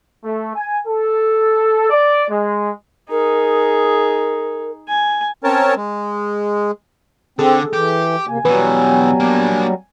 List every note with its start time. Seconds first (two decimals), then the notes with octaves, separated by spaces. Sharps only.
0.24 A3
0.55 G#5
0.86 A4
1.89 D5
2.28 G#3
3.10 D#4 G#4 A#4
4.88 G#5
5.44 C4 C#4 A#4 C#5 A5
5.77 G#3
7.39 D3 C4 G#4 A4
7.73 E3 G4
8.27 E2 C3 A#3 G#5
8.45 B2 E3 F#3 G3 B3
9.20 A#3 D4